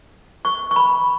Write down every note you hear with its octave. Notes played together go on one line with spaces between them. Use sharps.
C#6
C#6
B5